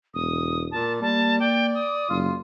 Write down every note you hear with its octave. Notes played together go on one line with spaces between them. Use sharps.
E1 D#6
A#2 A5
G3 A#3 A5
D5 G5
D#6
F#1 F4